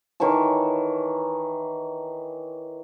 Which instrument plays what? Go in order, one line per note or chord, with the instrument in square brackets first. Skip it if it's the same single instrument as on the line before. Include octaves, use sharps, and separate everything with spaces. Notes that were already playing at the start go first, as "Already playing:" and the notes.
[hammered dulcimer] D#3 E3 C#5 A5